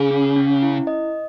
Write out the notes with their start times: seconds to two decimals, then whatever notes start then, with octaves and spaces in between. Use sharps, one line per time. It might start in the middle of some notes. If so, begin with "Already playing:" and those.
Already playing: C#3 G#4
0.11 C#4
0.36 C#4
0.62 E4
0.87 D#5